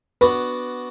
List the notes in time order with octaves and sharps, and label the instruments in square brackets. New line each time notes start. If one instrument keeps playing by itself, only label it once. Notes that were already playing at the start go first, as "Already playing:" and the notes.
[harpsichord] B3 D4 F#4 [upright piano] B4